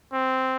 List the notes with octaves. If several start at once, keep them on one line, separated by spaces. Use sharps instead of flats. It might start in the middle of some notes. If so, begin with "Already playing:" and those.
C4